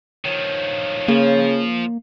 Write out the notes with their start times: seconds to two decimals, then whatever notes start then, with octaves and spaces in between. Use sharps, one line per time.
0.25 D#3 F3 C#5
1.08 C#3 F3 A#3